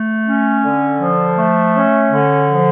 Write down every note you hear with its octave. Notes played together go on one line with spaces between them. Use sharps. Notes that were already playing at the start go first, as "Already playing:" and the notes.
Already playing: A3
C#4
D3
F3
A3
C#4
D3
F3